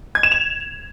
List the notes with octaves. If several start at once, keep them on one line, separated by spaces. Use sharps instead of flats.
G#6
E7
F7